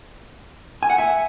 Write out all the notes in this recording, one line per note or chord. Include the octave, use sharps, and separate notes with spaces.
G#5
F#5
E5 G#5